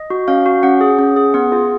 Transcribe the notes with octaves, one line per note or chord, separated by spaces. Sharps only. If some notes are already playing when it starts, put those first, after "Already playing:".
Already playing: D#5
F#4
C#4 F5
F#4
C#4 F#5
G#4
C#4
G#4
B3 F#5
F4 G#4